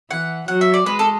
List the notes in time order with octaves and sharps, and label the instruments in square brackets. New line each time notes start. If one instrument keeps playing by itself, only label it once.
[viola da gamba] E3 [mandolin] F#5
[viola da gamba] F#3 [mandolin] F#5
[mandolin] E5
D5
[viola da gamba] G#3 [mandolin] B4
[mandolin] A4